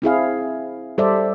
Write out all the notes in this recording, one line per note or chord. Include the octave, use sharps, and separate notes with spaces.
C4 E4 G#4 F5
G3 A4 C5 D5 E5